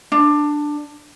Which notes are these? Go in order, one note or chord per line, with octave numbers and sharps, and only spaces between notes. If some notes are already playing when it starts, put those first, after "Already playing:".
D4